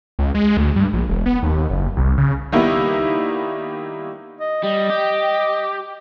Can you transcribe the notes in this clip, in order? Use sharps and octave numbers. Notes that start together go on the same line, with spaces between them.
C#2
G#3
D2
G2
A#1
E1
B3
D#2
F#1
C2
C#3
D#3 G3 A#3 B3 D#4 E4
D#5
G3 D#5
G4